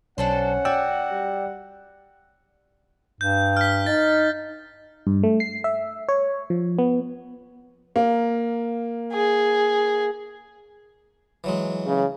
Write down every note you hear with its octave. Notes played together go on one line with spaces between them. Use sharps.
B1 C#4 D4 A4 C5 F#5
F#4 D5 G5 E6
G3
G2 G6
F6 B6
D#4 A6
G2
A3
C7
E5
C#5
F3
B3
A#3
G#4
E3 F#3 G#3
C#3